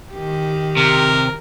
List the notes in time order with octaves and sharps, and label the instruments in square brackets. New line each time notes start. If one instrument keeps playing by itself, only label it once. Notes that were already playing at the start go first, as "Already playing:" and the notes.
[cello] D#3 G4
[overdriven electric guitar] C3 [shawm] A#4